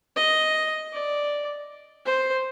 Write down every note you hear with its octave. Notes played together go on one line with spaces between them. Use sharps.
D#5
D5
C5